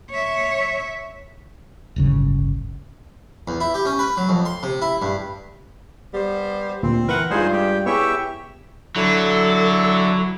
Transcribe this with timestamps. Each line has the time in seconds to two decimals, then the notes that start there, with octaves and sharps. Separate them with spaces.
0.11 C#5 E5
1.96 D1 G1 C#3
3.48 E2
3.60 E4
3.74 G4
3.86 C#4
3.99 B4
4.17 F#3
4.29 F2
4.45 C6
4.63 C3
4.82 E4
5.02 G2
6.14 G3 B3 C5
6.83 D2 A#2 C4
7.09 E3 A#4 B4 F#5
7.31 G2 G3 G#3 D#4 F4 G#4 C5
7.53 G4
7.86 B3 E4 G4 G#4 C#5 E5
8.96 D3 F#3 E4 A4